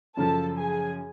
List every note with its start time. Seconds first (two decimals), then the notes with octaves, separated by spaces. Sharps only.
0.17 F#2 C#3 F3 A4 A5
0.58 G#4 G#5